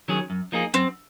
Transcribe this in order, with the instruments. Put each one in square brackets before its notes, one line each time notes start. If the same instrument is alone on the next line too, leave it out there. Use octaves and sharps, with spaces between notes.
[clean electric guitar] D#3 F#3 C#4 G#4
F#2
F3 A#3 D#4 G#4
[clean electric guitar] F#2 [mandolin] C4